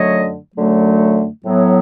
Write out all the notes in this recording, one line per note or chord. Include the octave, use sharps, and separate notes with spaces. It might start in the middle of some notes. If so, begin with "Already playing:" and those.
Already playing: F#2 D3 F#3 A3 C#5 D#5
F#2 D3 F#3 A3
A2 F#3 B3